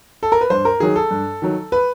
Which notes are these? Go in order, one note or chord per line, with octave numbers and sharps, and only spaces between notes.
A4
A#4
B4
G2 C5
A#4
D#3 F#3 G#4
A4
G2
D#3 F#3
B4